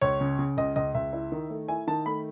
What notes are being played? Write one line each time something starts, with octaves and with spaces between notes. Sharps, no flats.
C#2 C#5
C#3
C#3
C#2 D#5
C#2 D#5
C#2 E5
E4
D#3
A3
E4 G#5
D#3 A5
A3 B5